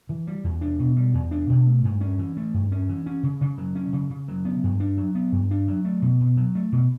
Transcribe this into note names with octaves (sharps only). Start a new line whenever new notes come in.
E3
G3
E2
D4
B2
G3
E2
D4
B2
A3
G2
C#4
E3
A3
G2
C#4
E3
C#4
C#3
C#3
F#3
C#4
C#3
C#3
F#3
B3
G2
D4
F#3
B3
G2
D4
F#3
A3
B2
B2
F#3
A3
B2